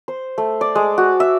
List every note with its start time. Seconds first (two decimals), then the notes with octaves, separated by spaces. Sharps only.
0.08 C5
0.38 A3
0.61 D5
0.75 G#3
0.98 F#4
1.20 E5